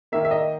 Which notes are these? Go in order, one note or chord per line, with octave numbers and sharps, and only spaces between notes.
D#3 A#3 E5
E5
D#5